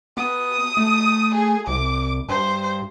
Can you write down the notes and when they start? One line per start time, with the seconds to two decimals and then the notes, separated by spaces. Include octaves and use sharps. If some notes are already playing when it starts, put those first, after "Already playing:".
0.17 B3 D#6
0.77 A3
1.35 G#4
1.67 C2 D6
2.29 G2 C5